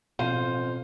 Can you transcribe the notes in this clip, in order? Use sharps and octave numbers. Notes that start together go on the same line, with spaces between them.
A1 F2 B2 C5 F5 D#7